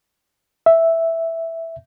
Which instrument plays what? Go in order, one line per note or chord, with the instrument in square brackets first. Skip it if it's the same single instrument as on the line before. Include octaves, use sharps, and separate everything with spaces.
[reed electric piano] E5